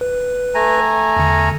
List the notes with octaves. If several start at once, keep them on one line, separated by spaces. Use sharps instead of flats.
B4
A3 G#5 A#5
E2 D3